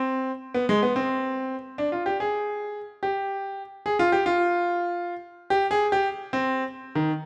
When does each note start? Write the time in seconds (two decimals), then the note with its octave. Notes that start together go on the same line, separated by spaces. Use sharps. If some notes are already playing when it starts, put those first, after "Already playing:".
Already playing: C4
0.54 B3
0.69 G#3
0.83 B3
0.96 C4
1.78 D4
1.92 F4
2.06 G4
2.20 G#4
3.03 G4
3.86 G#4
3.99 F4
4.12 G4
4.26 F4
5.50 G4
5.71 G#4
5.92 G4
6.33 C4
6.95 D#3